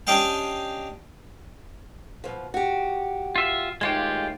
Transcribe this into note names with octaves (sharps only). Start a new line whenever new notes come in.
C#4 D4 G4 D#5 F5 G5
B2 F3
F#4 G4
F4 E5
D#2 A2 G#3 F4 G4